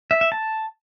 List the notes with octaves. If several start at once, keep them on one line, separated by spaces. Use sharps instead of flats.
E5
E5
A5